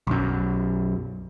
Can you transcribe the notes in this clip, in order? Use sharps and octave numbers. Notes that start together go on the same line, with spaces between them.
B1 F#2